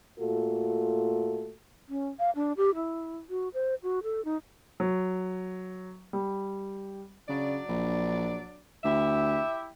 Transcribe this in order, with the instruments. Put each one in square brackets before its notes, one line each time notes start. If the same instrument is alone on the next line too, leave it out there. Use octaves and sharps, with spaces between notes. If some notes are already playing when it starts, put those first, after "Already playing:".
[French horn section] A#2 A3 F4 F#4 A4
[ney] C#4
F5
D4
G4
E4
F#4
C5
F#4
A4
D#4
[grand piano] F#3
G3
[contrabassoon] C#3 [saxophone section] F#3 D4 D5
[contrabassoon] A#1
[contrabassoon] D2 [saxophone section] E4 G4 E5